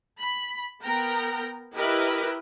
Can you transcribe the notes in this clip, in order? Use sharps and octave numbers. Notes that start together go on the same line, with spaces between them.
B5
B3 A#4 G5 A#5
E4 G4 A#4 B4 D#5